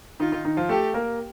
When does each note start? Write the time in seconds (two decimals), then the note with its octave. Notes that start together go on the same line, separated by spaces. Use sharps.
0.20 D#3 D#4 F4
0.32 D#3 D#4
0.45 D#3 D#4
0.57 F3 F4
0.69 A3 G4 A4
0.94 A#3 A#4